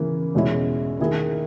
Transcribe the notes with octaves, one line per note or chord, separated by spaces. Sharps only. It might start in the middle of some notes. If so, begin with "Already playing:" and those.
Already playing: C#3 E3 A#3
E2 B2 G#3 C#4 E4
D#3 A#3 E4 G#4